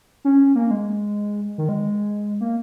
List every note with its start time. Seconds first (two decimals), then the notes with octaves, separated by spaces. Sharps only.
0.25 C#4
0.56 A#3
0.71 G#3
1.58 D#3
1.69 G#3
2.41 A#3